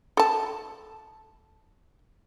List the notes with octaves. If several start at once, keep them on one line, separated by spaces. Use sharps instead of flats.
A4 A5